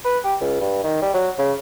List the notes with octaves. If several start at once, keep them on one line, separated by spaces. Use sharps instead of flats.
B4
G4
C#2
G2
D#3
G3
F#3
C#3